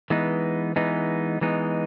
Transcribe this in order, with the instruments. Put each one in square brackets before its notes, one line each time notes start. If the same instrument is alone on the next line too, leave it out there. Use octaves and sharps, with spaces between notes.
[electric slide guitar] E3 G#3 B3 D#4
E3 G#3 B3 D#4
E3 G#3 B3 D#4